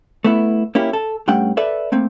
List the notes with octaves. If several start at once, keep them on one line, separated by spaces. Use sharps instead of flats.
A3 B3 E4
A#3 C#4 E4 G4
A4
G2 A3 C#4 F#5 G5
A4 B4 D5 E5
A3 A#3 C4